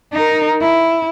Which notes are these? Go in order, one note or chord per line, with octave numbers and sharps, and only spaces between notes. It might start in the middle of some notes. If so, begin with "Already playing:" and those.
D#4 A#4
E4